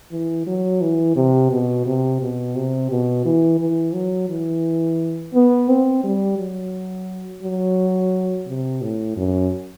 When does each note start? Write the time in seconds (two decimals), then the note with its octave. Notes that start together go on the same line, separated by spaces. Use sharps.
0.12 E3
0.47 F#3
0.81 E3
1.16 C3
1.52 B2
1.86 C3
2.21 B2
2.55 C3
2.91 B2
3.25 E3
3.60 E3
3.94 F#3
4.29 E3
5.34 B3
5.69 C4
6.04 G3
6.38 F#3
7.43 F#3
8.47 C3
8.82 A2
9.17 F#2